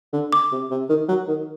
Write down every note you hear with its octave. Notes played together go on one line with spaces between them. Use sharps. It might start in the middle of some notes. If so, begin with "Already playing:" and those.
D3
D6
C3
C3
D#3
F#3
D#3